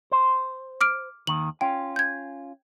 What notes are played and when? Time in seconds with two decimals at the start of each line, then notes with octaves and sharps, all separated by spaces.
0.12 C5
0.81 D6 F6 D7
1.27 D#2 D#3 F#7
1.61 C#4 F4 G5
1.96 G6 G#6